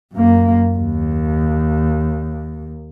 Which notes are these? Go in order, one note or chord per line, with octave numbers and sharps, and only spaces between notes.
F#2 A#3
D#2